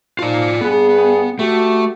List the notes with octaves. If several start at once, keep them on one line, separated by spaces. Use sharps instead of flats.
F3 D#4 F4 D5
G2 B3 G#4
A3 F#4 G4